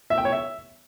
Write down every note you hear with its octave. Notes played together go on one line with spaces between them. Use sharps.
E5
G5
C#5
E5